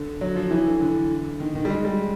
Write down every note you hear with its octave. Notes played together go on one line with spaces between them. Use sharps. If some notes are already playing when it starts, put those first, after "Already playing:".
Already playing: D3
F#3
F3
E3
D3
D3
D#3
D#3
G3
G#3
G3